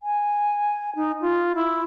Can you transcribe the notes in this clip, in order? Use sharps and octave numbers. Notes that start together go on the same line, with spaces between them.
G#5
D#4
F4
E4